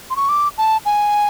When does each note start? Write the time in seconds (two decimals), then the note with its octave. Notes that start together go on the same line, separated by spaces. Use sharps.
0.10 C6
0.16 C#6
0.29 D6
0.58 A5
0.85 G#5